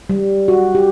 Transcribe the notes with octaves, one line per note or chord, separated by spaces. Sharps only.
G3
F#4
G4